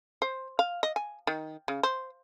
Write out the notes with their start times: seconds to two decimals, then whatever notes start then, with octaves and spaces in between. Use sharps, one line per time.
0.22 C5
0.59 F5
0.83 D#5
0.96 G#5
1.27 D#3
1.68 C#3
1.83 C5